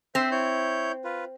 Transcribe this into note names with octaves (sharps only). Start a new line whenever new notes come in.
C4 C5 E5
E4 C#5 G6
F4 B4